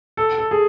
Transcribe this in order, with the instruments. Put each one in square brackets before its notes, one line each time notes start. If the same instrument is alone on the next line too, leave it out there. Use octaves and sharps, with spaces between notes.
[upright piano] A4
A4
G#4